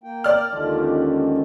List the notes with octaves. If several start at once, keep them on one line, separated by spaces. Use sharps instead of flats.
A#3 G5
D5 F6
D#2 D3 D#3 F3 G#3
C#4 G4 F#5
G#3 A4